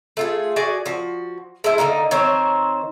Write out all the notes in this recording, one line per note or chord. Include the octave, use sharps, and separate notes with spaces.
A3 F4 G#4
F#4 G#4 D5 G#5
F3 F#4
G#3 A3 E4 C5
D3 D#3 A#3 D#4
D#3 C4 C5 C#5